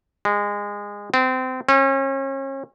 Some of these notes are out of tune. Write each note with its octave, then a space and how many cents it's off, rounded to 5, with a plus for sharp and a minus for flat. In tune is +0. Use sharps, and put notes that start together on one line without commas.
G#3 -20
C4 -25
C#4 -35